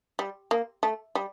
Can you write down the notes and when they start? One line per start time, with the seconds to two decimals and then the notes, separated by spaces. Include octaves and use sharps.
0.19 G3
0.51 A#3
0.83 A3
1.15 G3